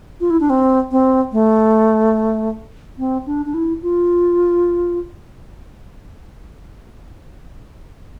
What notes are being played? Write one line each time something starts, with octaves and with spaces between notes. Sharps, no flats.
F4
E4
D4
C4
C4
A3
C4
D4
D4
E4
F4